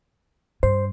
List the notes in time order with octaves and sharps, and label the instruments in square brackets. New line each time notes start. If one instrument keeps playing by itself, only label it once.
[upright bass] G2 [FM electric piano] C5